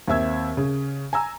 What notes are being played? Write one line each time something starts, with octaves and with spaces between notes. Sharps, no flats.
D#2 C4 E5 E6 G#6
C#3
G#5 A#5 E6